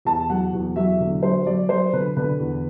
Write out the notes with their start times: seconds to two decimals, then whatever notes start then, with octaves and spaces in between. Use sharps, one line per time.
0.05 E2 A5
0.30 F#3 F#5
0.53 E2
0.76 F#3 E5
1.00 D3
1.23 F#3 C5
1.46 F#3 D5
1.69 F#3 C5
1.93 D3 B4
2.17 D3 B4
2.39 E2